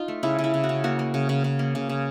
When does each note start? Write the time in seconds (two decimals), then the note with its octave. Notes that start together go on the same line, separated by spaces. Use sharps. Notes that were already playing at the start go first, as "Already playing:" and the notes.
Already playing: D#4 F4
0.08 A3
0.23 C#3 E4
0.39 C#3
0.44 E4
0.54 C#3
0.64 F#4
0.69 C#3
0.84 A#3 F#4
0.99 A#3
1.14 C#3
1.29 C#3
1.44 C#3
1.59 A#3
1.75 C#3
1.89 C#3